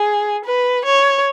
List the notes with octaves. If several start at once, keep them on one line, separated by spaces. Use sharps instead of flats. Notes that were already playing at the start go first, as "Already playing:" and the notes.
Already playing: G#4
B4
C#5